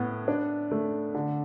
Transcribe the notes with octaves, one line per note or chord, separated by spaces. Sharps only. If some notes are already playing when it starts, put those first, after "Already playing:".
Already playing: A2 B3
D4
A3
D3